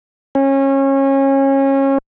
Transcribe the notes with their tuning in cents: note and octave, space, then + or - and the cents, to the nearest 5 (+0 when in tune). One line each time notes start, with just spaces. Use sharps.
C#4 -25